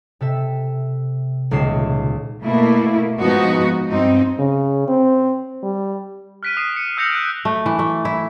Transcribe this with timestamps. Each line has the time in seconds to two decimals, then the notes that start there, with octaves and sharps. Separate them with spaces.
0.21 C3 A4 E5
1.51 D#1 C#2 C#4 C7 E7
2.43 B2 A3 A#3 E4
3.20 G#2 B2 F3 B3 D#4 F#4
3.89 G2 C4 D#4
4.39 C#3
4.88 C4
5.63 G3
6.43 F6 F#6 B6 D7 D#7
6.57 D#6 C7 D#7 E7
6.76 C#7
6.97 E6 F6 G6 A#6 C#7 F7
7.12 F#6 D7
7.45 A3
7.66 E3
7.79 A3
8.05 E4